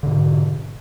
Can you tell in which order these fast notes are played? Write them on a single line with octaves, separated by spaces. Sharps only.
D3 G#2 B2